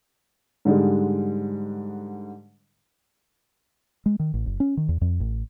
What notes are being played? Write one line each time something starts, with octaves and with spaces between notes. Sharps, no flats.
G#2 D3 G3 G#3
G#3
D#3
A1
F#1
C#4
D#3
E2
F2
A1